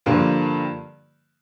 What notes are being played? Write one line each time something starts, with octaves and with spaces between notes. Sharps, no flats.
G2 D3 F3 A#3 F4